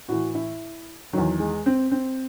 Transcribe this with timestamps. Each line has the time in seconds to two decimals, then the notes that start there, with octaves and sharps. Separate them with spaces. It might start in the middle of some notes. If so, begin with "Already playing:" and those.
0.08 A2 E3 F#4
0.35 E4
1.13 E2 D#3 F#3
1.40 G#3
1.66 C4
1.91 C4